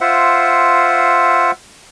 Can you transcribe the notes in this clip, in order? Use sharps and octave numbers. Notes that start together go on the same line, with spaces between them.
F4 C5 E5 F#5